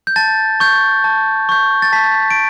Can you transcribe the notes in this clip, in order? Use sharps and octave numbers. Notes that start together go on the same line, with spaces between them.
G6
A5 A6
C#6 G6
A5
C#6 G6
A6
A5 B6
D7